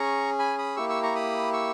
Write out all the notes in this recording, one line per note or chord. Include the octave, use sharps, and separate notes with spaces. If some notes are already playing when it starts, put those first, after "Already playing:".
Already playing: C#4 G#4 A#5 C#6
G#5 B5
B5 D#6
A#3 E4 G4 C#6 E6
C#6 E6
A#5 C#6
B5 D#6
C#6 E6